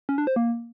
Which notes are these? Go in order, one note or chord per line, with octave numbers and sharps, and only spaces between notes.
C#4
D4
C5
A#3